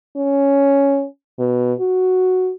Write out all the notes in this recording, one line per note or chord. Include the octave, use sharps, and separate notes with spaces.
C#4
B2
F#4